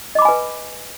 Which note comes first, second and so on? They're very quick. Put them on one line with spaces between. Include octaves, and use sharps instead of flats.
D#5 D6 B5 G#5 B4